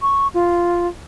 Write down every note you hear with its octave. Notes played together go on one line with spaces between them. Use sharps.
C#6
F4